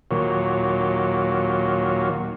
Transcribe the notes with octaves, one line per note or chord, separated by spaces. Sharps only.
D#2 A#2 F#3